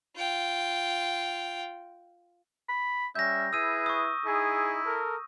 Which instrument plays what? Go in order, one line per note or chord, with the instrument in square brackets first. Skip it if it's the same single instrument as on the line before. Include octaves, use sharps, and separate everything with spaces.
[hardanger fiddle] F4 G5
[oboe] B5
[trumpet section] G3 C#4 [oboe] E5 [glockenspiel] G6 A#6
[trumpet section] E4 B4 [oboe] G#4 [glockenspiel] E6 D#7
[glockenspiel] C#6 D#6
[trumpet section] D#4 G#4 [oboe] E4
[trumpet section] A4 A#4